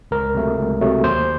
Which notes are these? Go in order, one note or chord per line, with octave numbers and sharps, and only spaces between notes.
C#2 A#4
C3 F#3 A3
C#2
C3 F#3 A3
D#2 C5